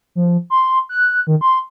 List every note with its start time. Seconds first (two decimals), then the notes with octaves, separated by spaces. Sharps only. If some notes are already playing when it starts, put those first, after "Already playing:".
0.15 F3
0.50 C6
0.89 F#6
1.27 D#3
1.41 C6